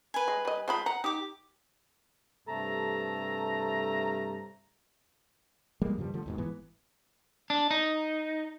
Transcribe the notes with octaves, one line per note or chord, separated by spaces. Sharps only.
B4 G#5
G#3
G3 D#5
F3 G#3 F4 C5 B5
F#5 A#5
D#4 G4 D6
G2 C3 A3 A4 A#5
F3 G3 G#3 A#3
G2 C#3 F3 G3
D3 F3 A3
D#2 G#2 B2
G1 G#2 E3 B3
D4
D#4